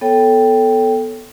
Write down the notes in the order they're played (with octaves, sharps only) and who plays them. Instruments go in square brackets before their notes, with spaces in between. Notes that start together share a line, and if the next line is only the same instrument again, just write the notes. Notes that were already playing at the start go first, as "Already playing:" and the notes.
[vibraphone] B3 A4 C#5 G5